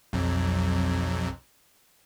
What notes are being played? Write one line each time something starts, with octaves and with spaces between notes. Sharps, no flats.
B1 F2